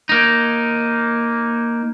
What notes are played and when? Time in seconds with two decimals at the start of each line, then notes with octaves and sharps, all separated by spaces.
0.09 A#3 D#4